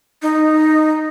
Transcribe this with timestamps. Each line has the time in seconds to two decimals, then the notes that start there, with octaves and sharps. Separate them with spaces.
0.22 D#4